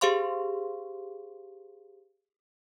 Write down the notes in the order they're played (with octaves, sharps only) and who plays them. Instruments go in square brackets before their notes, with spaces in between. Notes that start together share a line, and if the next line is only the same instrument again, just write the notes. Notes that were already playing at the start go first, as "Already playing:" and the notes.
[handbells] G4 G#4 C5 F5 C6 C#6